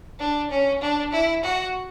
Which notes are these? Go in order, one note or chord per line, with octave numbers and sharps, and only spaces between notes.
D4
C#4
D4
E4
F#4